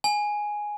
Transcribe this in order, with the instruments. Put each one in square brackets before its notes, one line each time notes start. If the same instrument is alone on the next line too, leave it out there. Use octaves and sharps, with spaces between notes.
[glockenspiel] G#5